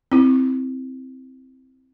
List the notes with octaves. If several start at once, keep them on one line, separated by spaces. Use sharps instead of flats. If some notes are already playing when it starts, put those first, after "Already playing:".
C4 E4